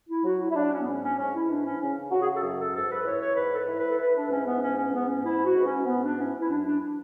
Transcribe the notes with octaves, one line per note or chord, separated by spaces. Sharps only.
E4
F#3 F#4
E4
E4
F#3 D4
C#4
B3
G#2 C#4
C#4
G#2 C#4
E4
E3 D4
C#4
C#3 C#4
C#3 F#4
G#4
F#4
A4
F#2 G#4
A4
G#2 A4
B4
E3 C#5
C#5
G#2 B4
A4
B4
E3
B4
A4
E3 B4
D4
G#2 C#4
B3
E3 C#4
C#4
G#2 B3
C#4
G#2 E4
F#4
G#2
B3
C#4
G#2 B3
D4
E3 C#4
E4
F#2 D4
D4
D4